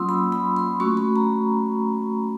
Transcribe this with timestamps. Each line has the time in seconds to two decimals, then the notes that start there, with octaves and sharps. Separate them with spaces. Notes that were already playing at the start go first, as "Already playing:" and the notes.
Already playing: F#3 A#3 C#4 F4 C6 D#6 E6
0.09 B5
0.32 B5
0.56 C6
0.80 A3 C#4 F#4 C#6
0.97 B5
1.16 A#5